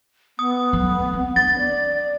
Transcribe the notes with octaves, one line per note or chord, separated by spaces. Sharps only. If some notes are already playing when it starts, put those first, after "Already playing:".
B3 D#6
F#3 A3
C4
D4 A6
D5